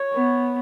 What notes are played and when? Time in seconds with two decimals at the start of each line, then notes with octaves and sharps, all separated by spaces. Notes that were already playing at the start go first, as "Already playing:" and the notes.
Already playing: C#5
0.13 B3